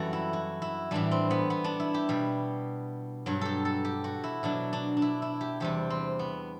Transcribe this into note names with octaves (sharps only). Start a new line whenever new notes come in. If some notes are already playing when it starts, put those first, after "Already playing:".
Already playing: F#2 E3 G3 F#4 A4
E4
F#4
E4
A2 E3 G3 D4
C4
B3
B3
D4
E4
G4
B2 G3
G2 F#3
G4 A4
A4
G4
F#4
E4
B2 F#3 D4
D4
D4
E4
E4
G4
E2 C3 G3 G4
C4
B3